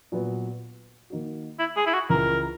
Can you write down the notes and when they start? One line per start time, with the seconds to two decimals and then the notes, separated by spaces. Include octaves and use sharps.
0.12 A#2 F#3 B3
1.10 D#3 A#3 D#4 F#4
1.59 E4
1.76 G#4
1.86 E4
1.93 F#4
2.10 C#2 C#3 E3 A#4